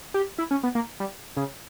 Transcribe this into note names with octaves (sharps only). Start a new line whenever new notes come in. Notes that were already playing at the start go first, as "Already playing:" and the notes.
G4
E4
C#4
B3
A#3
G3
C#3